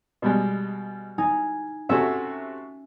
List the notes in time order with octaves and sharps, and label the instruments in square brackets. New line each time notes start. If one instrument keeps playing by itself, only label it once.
[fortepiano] B2 G3 G#3
[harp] D#4 G#5
[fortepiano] C3 A3 F#4 [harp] C#4 E5